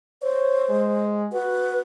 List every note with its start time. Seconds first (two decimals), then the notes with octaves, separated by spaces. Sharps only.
0.22 C5 C#5
0.69 G#3
1.33 F#4 B4